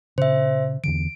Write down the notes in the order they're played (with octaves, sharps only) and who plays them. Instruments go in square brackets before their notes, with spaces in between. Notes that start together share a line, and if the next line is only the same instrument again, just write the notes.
[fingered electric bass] A#2 C#3 [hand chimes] C5 E5
[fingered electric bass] E2 D3 E3 [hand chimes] D7